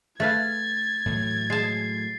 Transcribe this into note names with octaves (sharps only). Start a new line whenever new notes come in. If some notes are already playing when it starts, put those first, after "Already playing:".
A3 B4 F5 G#6 A6
A2 E3 F#3
G#3 A5 C7